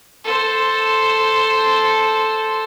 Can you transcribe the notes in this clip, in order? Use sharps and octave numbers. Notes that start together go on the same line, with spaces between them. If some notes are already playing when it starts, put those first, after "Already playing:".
A4 C5